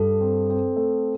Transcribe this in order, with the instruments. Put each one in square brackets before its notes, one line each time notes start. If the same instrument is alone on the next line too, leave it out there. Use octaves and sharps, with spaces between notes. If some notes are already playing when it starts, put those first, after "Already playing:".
Already playing: [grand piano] G2 [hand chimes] A4
[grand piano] C4
C4
A3